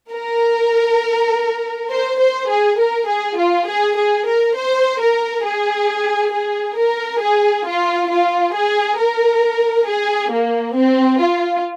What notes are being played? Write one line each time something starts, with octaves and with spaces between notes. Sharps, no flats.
A#4
C5
C5
G#4
A#4
G#4
F4
G#4
G#4
A#4
C5
A#4
G#4
G#4
A#4
G#4
F4
F4
G#4
A#4
G#4
A#3
C4
F4